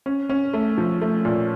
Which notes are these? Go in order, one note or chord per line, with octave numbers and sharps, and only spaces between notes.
C#4
C#4
A3
F3
A3
A#2